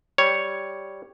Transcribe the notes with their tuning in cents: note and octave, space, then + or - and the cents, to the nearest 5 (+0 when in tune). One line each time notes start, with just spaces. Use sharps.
G3 +0 C#5 +0